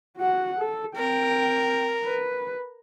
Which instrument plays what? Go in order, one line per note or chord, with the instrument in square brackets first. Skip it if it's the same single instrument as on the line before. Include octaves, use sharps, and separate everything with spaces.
[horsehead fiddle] F#4 F#5
A4
[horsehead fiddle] C4 G5 [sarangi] A#4
[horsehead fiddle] B4